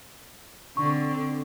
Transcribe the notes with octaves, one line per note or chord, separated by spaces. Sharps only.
D3 C4 C#6